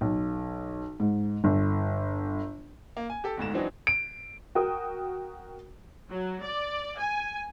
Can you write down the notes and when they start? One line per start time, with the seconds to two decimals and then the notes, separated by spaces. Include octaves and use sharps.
0.01 B1
1.00 G#2
1.44 G1
2.97 A#3
3.10 G#5
3.24 G4 A4
3.37 G1 D2 G#2 E7
3.54 E3 F#3 C4 D4 D#4
3.87 D7
4.55 F#4 A#4 G5 D#6
6.11 F#3
6.42 D5
6.99 G#5